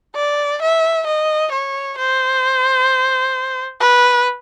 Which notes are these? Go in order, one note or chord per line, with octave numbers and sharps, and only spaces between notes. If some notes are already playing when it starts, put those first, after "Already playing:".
D5
E5
D#5
C#5
C5
B4